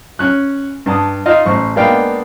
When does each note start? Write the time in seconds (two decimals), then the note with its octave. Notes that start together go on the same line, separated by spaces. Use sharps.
0.19 C#4 F#6
0.86 G2 A5 D#6
1.25 D#4 F4 D#5 F5
1.46 A1 C5 C#6
1.76 G#3 A#3 B3 D4 F5 G5